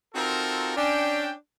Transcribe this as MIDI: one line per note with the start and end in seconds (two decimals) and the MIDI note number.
0.15 0.75 60
0.15 0.75 63
0.15 0.75 65
0.15 0.75 66
0.15 0.75 69
0.15 0.75 70
0.77 1.32 61
0.77 1.32 62
0.77 1.32 79